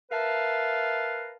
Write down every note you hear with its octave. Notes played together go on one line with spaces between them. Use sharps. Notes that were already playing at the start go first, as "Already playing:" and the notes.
A#4 B4 E5 F5 A5